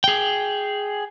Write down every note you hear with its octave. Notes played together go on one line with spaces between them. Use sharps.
G#4 G5